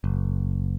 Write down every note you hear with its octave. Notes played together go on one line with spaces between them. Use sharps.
F#1